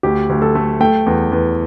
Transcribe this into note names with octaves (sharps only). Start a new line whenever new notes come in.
D2 G4
D2
A4
A3
A3 G5
E2
E2